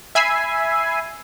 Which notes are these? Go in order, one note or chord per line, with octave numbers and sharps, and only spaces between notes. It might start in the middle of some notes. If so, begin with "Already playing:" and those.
E5 G#5 B5 E6 C7